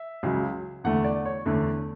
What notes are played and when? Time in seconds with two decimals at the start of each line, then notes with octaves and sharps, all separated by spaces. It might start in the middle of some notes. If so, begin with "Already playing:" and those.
Already playing: E5
0.23 C#2 C#3 F#3
0.84 E2 D3 A3 F#5
1.04 D5
1.25 C#5
1.46 E2 D3 A3